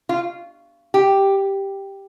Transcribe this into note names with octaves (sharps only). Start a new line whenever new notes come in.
F4
G4